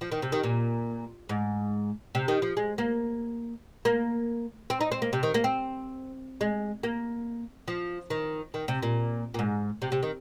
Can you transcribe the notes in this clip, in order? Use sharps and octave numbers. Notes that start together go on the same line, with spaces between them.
F3
D#3
C3
D#3
A#2
G#2
C3
D#3
F3
G#3
A#3
A#3
C4
D#4
C4
A#3
C3
D#3
A#3
C4
G#3
A#3
F3
D#3
D#3
C3
A#2
A#2
G#2
C3
C3
D#3